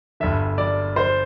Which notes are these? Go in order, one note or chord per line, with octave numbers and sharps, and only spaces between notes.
G1 G2 D3 E5
D5
C5